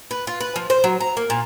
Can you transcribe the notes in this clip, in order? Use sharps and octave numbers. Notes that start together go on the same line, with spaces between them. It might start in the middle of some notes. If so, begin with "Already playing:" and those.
B4
F4
B4
F3
C5
F#3
A#5
A#3
A#2